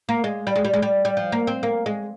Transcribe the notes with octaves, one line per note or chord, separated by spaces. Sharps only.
A#3
G#3
G3
G#3
G3
G#3
G3
G3
F3
A#3
C4
A#3
G#3